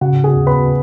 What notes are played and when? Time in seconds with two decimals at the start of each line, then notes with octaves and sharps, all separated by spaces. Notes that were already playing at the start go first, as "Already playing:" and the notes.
0.01 C#3 F#4 F#5
0.24 G#4 G#5
0.35 D#2
0.47 B4 B5